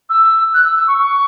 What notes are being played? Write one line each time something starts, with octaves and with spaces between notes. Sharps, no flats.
E6
F#6
E6
E6
C#6
C#6